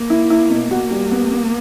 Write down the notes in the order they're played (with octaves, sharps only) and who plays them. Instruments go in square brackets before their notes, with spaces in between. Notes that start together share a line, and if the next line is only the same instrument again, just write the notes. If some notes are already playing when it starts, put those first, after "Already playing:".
Already playing: [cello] A#3
[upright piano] E4
E4
B2
[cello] A#3 [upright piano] F#4
[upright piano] G3
B3
B3